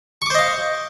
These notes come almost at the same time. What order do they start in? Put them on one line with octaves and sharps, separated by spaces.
C#6 D6 C5 D#5 F5